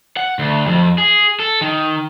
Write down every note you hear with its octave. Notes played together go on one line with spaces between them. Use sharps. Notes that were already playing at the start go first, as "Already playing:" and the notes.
F#5
D2
F2
G#4
A4
D#3